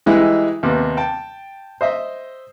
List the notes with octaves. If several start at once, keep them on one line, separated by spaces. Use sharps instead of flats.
E3 G3 G#3 D#4 E4
D#2 C3 B3
G5 A5
C5 D#5 E5